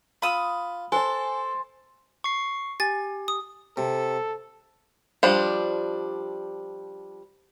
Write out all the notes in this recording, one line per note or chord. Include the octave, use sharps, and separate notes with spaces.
F4 B5 D#6 E6
A4 C5 G#5 A5
C#6 C7
G4 G#5 A6
D#6
C3 A4
F3 G3 D4